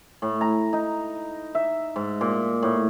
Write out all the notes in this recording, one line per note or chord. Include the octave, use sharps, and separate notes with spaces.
A2
A#5
D#4
E5
G#2
A#2
A2